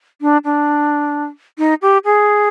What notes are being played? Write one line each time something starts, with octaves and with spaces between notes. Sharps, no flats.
D4
D4
D#4
G4
G#4